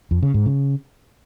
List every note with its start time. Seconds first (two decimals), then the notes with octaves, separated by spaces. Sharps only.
0.11 F2
0.23 C#3
0.34 G#2
0.46 C#3